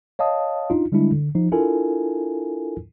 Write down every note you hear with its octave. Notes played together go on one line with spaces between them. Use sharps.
C#5 D#5 F5 A5 D#6
D4 D#4 F4
D3 G3 G#3 D4 E4
D3
F3 D#4
D4 E4 F4 A4 A#4 G#5